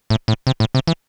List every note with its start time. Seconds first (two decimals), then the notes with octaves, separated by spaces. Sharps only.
0.10 A2
0.28 A2
0.47 C3
0.60 A2
0.75 C3
0.87 E3